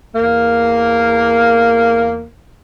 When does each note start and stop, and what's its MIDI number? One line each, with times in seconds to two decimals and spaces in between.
0.15 2.27 40
0.15 2.27 58